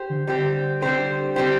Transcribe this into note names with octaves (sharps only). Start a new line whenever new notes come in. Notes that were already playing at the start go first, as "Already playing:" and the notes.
Already playing: G4 C5
D3
D3 G3 C4 G4 C5
G3 C4 G4 C5
G3 C4 G4 C5